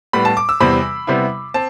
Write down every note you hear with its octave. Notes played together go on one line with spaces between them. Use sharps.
A2 G3 B3 B5
A5
D6
E6
E2 C3 E3 G3 C4 B5
C3 G3 B3 E4
C4 A5